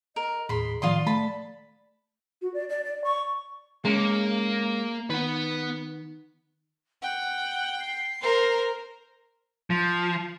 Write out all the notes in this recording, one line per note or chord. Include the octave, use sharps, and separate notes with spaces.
A#4 D#5
D#2 A2 G#4 B5 C6
A2 D#3 F3 F4 D5 D#5 C6
A3 A5 B5
F#4
D5
D5
D5
C#6
G#3 A#3 C#4
D#3 B3 B4
F#5 G5
C7
A#4 C5
F3